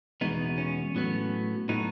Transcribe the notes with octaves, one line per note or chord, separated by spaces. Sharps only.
E2 B2 G#3 B3 D#4
C#4
A2 F#3 B3
A2 F#3 B3 D#4